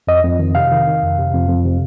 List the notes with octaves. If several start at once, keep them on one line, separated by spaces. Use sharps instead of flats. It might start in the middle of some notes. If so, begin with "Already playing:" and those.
F2 D#5
F2
D#3
C3 F5
D#3
D#3
F2
C3
F2
F2
C3